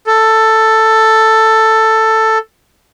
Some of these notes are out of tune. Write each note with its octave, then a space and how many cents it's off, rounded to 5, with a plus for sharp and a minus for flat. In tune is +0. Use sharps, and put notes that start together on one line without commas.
A4 +10